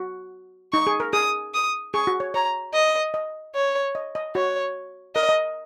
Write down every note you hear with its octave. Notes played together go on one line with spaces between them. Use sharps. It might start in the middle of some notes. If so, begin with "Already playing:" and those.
Already playing: F#4
D#4 C#6
G#4
A#4
G#4 D#6
D#6
G#4 C#6
F#4
C#5
C#5 A#5
D#5
D#5
C#5
D#5
D#5
F#4 C#5
A#4 D#5
D#5